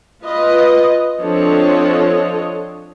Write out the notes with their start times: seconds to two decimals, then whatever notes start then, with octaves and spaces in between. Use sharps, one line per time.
0.24 F4 B4 D#5
1.20 F3 C4 D4 A4 C#5 D#5